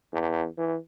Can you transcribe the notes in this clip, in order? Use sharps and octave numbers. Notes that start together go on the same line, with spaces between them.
E2
E3